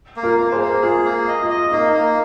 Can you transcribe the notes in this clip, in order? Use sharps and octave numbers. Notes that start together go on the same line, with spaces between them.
A#3
F4 A#4
A#3
G#4 C5
A#3
F4 G#4 A#4
A#3
D#5
F4
D#5
A#3 D#4
A#3